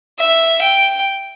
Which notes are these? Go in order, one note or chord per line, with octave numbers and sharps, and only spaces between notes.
E5
G5